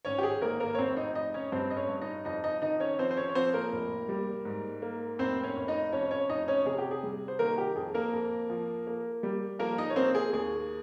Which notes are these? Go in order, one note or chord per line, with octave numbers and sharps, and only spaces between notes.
G#1 C#4 C#5
G4
G#4
G#1 A#3 A#4
A#3 A#4
C#5
F1 C4 C5
D#4 D#5
F1 D#4 D#5
C#4 C#5
G2 C4 C5
D#5
C#4 C#5
G2
D#4 D#5
F2 D#4 D#5
D#4 D#5
D#3 D#4 D#5
C#4 C#5
F3 C4 C5
C5
C#4 C#5
C#5
F3 C4 C5
A#3 A#4
F1
G3
G#2
A#3
F1 C4 C5
C#4 C#5
F1
D#4 D#5
F2 C#4 C#5
C#4 C#5
F1 D#4 D#5
C#4 C#5
C3 G#4
G4
G#4
G3
C5
D#3 A#3 A#4
G4
F2 G#4
A#3 A#4
F2
F3
A#3
G3
F3 A#3 A#4
D#4 D#5
C#5
A#3 C4 C5
G#4
D#2 G#4